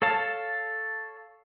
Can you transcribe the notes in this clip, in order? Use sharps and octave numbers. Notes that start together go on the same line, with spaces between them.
A4 C#5 F5 A5